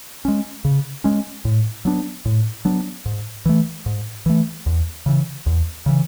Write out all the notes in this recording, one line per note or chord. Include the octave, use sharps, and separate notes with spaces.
G#3 C#4
C#3
G#3 C#4
A2
F#3 B3 D4
A2
F#3 B3 D4
G#2
E3 A3
G#2
E3 A3
E2
C#3 E3
E2
C#3 E3